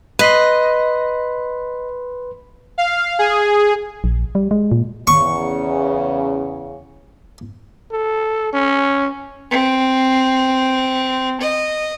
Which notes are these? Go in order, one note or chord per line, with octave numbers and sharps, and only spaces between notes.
B4 D#5 B5 C6
F5
G#4
A#1
G3
G#3
A#2
E2 C#3 C#6
A4
C#4
C4
D#5